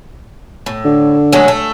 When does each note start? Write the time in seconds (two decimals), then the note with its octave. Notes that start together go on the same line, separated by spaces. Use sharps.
0.66 A2
0.85 D3
1.32 F#3 G#3 A3
1.48 A3